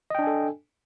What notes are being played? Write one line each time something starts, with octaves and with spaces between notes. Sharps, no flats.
D4 A4 D#5 G5 G#5